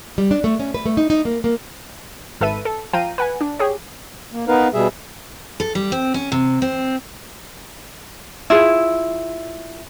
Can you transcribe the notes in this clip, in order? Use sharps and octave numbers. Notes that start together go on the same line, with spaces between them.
G3
D4
A3
C#4
B4
A3
D#4
D#4
A#3
A#3
G#1 A4 B4 E5 D#7
A4
F3 F5 G5 A#5 D#7
B4 F#5 G#5
D4
G4 G#4 C#5
A#3
B3 D#4 A#4 B4 F5
B2 G3 G#4 E5
A4
G3
C4
C#4
C3
C4
E4 F4 G#4